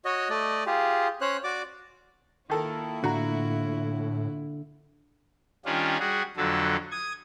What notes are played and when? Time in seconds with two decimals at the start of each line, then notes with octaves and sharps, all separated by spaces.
0.05 F#4 C#5 D#5
0.30 A3 D5 D#5
0.66 F4 G4 G#4
1.21 C#4 C5 C#5 F#6
1.44 F#4 D5 D6
2.50 D#3 A#3 E4 F4 A4 A#4
3.04 A2 D3 F#4 A#5
5.65 D#3 G3 C#4 D4 F4
6.00 G3 F#4 G#4
6.37 F2 D3 F#3 A4
6.92 D#6 G#6